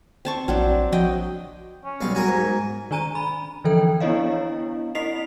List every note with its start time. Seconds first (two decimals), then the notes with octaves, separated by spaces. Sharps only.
0.25 C4 A5 C#6
0.48 A#1 F#3 C4 D4
0.65 A#1
0.92 F3 F#4 D#5 G5
1.85 C#4
2.01 B1 G3 F5
2.15 F#4 G#4 A#4 G#5
2.28 G#2
2.91 D#3 D4 G#5 A#5 D#7
3.15 B5
3.64 D3 E3 F3 A4 G5
4.00 B3 D4 E4 C#5 D#5 F5
4.95 C4 E4 D#5 B6 C7 F7